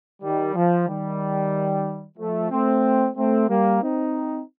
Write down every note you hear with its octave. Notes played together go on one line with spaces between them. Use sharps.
D#3 G3
F3
D#3 G3
F3 A3
A3 C4
A3 C4
G3 A#3
C4 D#4